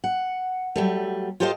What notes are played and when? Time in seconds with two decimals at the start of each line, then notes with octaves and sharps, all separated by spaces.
0.04 F#5
0.76 F#3 G3 A3
1.40 F4 G4 A4 C5 D#5 F5